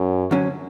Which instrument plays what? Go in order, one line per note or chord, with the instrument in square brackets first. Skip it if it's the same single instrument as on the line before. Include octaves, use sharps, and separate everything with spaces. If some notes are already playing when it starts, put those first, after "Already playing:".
Already playing: [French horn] F#2
[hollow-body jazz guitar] D2 D3 F#3 C#4